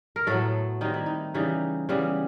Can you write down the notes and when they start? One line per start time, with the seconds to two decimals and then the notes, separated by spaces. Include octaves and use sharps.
0.16 A#4
0.27 A2 F#3 A3 B3 A4
0.81 D#3 G3 C4 D#4
0.94 E4
1.06 D#4
1.34 C#3 E3 G3 D#4
1.89 C#3 E3 G3 B3